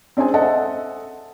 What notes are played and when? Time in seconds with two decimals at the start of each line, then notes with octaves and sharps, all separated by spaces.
0.17 C4 D4 G#4 C5 G#5
0.34 A4 C5 D#5 E5 F#5 A5